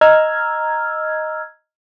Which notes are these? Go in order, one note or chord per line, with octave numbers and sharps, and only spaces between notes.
D#5 A#5 E6 F6 G#6